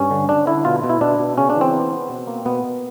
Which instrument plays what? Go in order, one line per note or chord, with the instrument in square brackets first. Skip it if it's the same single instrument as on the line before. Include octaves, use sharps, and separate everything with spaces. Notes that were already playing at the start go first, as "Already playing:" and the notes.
Already playing: [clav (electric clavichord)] G2 C#4
D3
D3 D4
D3 E4
B2 F4
B2
E4
B2 D4
B2
C#3 C#4
D4
E3
C4
B3
B3
B2
A#3
B2 B3
B2